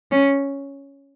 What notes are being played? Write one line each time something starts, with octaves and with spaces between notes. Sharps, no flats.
C#4